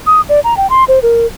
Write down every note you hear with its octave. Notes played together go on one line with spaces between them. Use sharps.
D#6
D5
A#5
G5
C6
C5
A#4